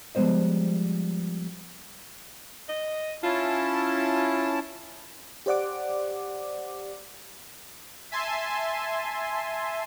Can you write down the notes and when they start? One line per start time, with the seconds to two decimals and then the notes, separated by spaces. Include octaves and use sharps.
0.15 F3 G3 G#3 B3 C5 D#5
2.69 D#5
3.23 C#4 E4 F4 A5
5.46 G4 C5 D5 F#5 D6
8.11 E5 G#5 A5 C6